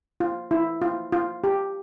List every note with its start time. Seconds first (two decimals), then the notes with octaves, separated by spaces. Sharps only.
0.20 F4
0.51 E4
0.82 F4
1.12 F4
1.44 G4